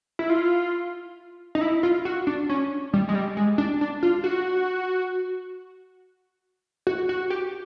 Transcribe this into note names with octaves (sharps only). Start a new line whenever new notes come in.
E4
F4
D#4
E4
F4
F#4
D4
C#4
G3
G#3
G3
G#3
D4
D4
F4
F#4
F#4
F#4
G4